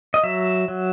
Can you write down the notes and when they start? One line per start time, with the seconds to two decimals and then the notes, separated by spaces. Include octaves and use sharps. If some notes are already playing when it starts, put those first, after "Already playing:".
0.14 D#5
0.24 F#3 E5
0.68 F#3